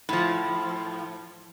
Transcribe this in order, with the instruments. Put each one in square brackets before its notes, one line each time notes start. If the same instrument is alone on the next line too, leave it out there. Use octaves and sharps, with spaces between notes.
[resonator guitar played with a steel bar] A2 F3